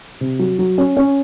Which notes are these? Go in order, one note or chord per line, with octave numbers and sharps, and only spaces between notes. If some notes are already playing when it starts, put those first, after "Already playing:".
C3
F#3
F#3
C#4
C#4